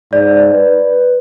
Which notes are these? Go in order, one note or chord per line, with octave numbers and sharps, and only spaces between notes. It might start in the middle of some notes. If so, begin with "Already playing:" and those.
G#2 D5
B4